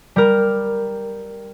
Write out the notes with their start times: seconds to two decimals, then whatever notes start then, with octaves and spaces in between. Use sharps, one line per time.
0.16 G3 A#4